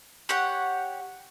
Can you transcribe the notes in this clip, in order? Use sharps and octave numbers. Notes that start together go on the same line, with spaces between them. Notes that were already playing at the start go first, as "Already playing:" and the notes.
G4 C#5 F#5